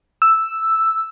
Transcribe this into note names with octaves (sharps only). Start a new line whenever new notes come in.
E6